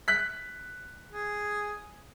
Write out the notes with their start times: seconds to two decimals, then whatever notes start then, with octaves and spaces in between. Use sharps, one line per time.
0.08 F#6 B6
1.09 G#4